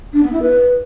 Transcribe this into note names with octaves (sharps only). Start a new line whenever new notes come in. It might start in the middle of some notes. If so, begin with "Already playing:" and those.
D4
B3
E4
B4